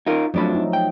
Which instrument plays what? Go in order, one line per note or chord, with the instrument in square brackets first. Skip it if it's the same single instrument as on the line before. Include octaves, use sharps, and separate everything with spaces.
[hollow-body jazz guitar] D#4 F4 A#4
[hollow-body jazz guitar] F2 D4 B5 [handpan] F3 F#3 A3
[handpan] D#4
[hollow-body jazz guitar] G5